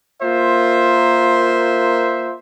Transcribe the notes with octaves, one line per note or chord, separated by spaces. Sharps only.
A#3 F4 A#4 C5 E5